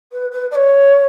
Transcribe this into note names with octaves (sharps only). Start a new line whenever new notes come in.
B4
B4
D5
C#5